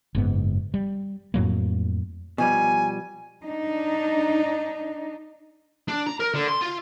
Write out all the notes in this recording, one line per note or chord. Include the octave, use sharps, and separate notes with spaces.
F#1 G#2 B3
G3
F2 A2 F#3 A#3
B2 F3 G3 G#5
D4 D#4
D4
A#5
A#4
D3
C6
F4